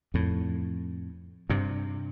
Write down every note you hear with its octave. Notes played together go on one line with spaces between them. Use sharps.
F2 A2
G2 C3